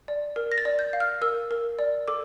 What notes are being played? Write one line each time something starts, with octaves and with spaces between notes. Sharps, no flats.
D5
A#4
A#6
A6
D5
G6
F5
F6
A#4 E6
A#4
D5
A4 D6